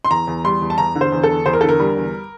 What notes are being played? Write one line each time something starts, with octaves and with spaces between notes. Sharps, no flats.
C6
E2 A#5
E2
G3 C6
E2
A5
E2 A#5
D3
C5
E2
A4
E2
E2 C5
A#4
D3 A4
A#4
G3
E2